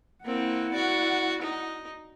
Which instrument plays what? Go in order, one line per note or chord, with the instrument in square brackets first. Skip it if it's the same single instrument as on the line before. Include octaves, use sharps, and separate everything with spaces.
[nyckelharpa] A#3 C4 [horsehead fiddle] E4 F#5
[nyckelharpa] F#4 D5
D#4